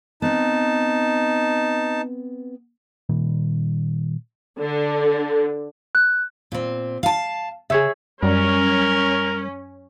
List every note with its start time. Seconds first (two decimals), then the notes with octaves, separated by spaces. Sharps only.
0.22 B3 C4 D#4 A5
3.09 A#2 D#3 G3
4.60 D3
5.95 F#6
6.52 A#2 C4
7.03 F5 A5
7.70 C#3 G#4 C#5 E5
8.23 F#2 G3 C#4 A#4